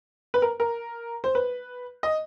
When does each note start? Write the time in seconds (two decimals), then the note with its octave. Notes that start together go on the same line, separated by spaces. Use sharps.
0.34 B4
0.42 A#4
0.60 A#4
1.24 C5
1.35 B4
2.03 D#5